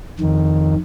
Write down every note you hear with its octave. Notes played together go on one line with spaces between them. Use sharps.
F2 D#3